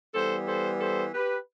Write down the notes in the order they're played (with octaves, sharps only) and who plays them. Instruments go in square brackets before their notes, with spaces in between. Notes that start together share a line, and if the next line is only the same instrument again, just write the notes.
[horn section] E3 G3 B3 A4 C5
A4 C5
A4 C5
G4 B4